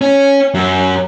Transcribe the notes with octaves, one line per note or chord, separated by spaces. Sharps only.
C#4
F#2